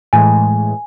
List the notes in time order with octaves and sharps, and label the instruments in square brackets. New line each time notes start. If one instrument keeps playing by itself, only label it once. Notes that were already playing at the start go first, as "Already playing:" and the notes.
[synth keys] A2 E3 G#3 [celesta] G#5